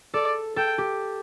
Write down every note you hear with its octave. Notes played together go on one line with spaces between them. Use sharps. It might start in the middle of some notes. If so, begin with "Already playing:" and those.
A4 D5
A4 G5
G4